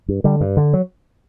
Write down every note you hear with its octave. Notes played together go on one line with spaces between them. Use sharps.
G2
D3 G3
G2
D3
F#3